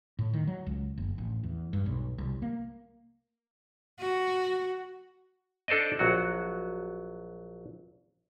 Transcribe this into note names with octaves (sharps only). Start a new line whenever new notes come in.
A2
D#3
F#3
C#2
F#1
A1
E2
G2
B1
C2
A#3
F#4
D4 A4 C5 D5 D#5
A#1 F#3 F#4